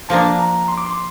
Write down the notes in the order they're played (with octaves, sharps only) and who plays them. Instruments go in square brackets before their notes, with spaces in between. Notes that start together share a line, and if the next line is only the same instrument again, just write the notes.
[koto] F3 A#3 D4 [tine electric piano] A5
[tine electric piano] A#5
C6
D6
C6